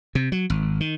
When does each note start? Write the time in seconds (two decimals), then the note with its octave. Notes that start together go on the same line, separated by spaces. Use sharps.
0.15 C3
0.32 F#3
0.50 G#1
0.81 D#3